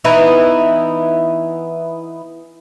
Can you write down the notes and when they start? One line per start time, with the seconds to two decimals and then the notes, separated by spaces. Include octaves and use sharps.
0.04 E3 B3 D#4 E4